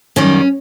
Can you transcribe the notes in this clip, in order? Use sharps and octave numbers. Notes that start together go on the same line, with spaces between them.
F#2 D#3 G3 C#4